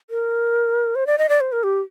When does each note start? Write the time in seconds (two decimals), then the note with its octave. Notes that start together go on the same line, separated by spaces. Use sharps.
0.10 A#4
0.95 C5
1.07 D5
1.18 D#5
1.29 D5
1.41 C5
1.52 A#4
1.63 G4